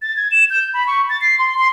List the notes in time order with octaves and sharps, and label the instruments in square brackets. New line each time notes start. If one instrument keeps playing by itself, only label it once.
[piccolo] A6
G#6
E7
G6
B5
C#6
A6
C7
C6
C6